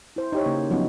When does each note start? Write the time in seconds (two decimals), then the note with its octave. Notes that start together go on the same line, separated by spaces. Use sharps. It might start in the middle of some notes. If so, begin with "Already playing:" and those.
0.16 E4 C5
0.32 D#4 G4 C#5
0.46 C#3 A#3
0.70 F3 F#3 B3 C#4 D#4